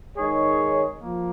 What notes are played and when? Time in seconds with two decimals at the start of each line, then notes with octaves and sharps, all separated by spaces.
0.16 D#3 G#3 D#4 G#4 C#5
1.00 F3 A#3